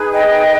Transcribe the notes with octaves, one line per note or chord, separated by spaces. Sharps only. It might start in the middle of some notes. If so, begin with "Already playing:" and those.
Already playing: D#4 G#4 B4
D#5 G5